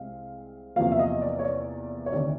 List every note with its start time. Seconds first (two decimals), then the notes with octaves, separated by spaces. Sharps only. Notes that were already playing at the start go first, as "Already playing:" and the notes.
Already playing: C2 G#3 C4 F5
0.76 E2 C3 F3 A#3 F5
0.92 E5
0.99 D#5
1.21 D5
1.39 C#5
1.45 D5
2.06 C#5
2.12 D2 C3 D#3 D5